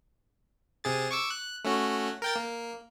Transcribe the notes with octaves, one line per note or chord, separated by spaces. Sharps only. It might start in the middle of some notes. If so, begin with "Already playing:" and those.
C3 G#4 A6
C#6 D6 E6
F#6
A3 C#4 F#4
A#4 G5 A6
A#3